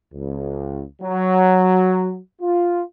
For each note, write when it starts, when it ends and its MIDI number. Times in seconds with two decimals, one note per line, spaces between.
0.13 0.82 37
1.01 2.18 54
2.41 2.81 65